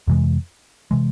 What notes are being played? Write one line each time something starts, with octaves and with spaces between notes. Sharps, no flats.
F2 C3 E3 G#3
C3 E3 G#3